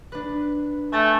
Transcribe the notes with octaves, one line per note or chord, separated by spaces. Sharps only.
D4 B4
A3 G#5 G6 A6